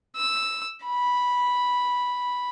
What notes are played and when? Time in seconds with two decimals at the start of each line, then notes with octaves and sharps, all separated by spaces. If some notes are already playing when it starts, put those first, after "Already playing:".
0.16 E6
0.85 B5